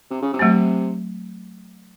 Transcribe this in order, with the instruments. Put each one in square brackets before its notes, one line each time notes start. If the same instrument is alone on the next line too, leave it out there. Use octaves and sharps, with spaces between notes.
[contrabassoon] C3
C#3
C3
[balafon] F#3 A3 C4